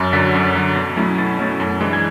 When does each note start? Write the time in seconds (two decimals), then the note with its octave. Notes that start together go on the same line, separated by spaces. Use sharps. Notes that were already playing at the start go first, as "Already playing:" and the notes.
Already playing: F#2 A6
0.13 D3 F#3 B6
0.34 F#2
0.55 D3 F#3
0.75 B2
0.96 F#3 A3 C#4 E4
1.18 B2 A6
1.39 F#3 A3 C#4 E4
1.60 F#2
1.80 E3 G#3 D4
1.93 G#6